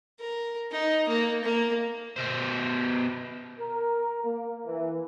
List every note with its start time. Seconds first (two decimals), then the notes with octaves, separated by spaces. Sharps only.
0.20 A#4
0.72 D#4
1.09 A#3
1.44 A#3
2.16 B2 C5
3.59 A#4
4.23 A#3
4.66 E3